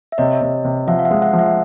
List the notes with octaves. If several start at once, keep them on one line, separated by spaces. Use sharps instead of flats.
E5
C3 C#5 D#5
C3
C3
F3 E5 F#5
F5
E5 F#5
G#3
E5 F#5
F3
E5 F#5